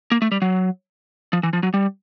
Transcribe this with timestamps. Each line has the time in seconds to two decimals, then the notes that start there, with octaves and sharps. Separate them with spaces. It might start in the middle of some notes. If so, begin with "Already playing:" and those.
0.11 A#3
0.22 A3
0.32 G3
0.42 F#3
1.33 F3
1.43 E3
1.53 F3
1.63 F#3
1.74 G3